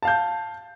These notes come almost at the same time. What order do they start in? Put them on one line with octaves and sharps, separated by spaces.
A5 F5 G6